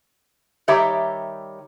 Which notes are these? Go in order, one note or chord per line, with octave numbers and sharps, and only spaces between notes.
D#3 G3 G4 C#5 E5 A#5